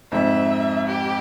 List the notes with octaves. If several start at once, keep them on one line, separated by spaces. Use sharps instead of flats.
F2 G#2 E5
G4